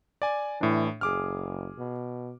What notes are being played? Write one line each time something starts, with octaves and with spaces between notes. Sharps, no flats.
D5 G#5
A2 E3 D4
F#1 G#4 D6 F6
B2